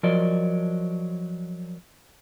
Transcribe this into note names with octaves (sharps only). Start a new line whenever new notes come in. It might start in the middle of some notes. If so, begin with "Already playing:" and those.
F3 F#3 A#4 D5 D#5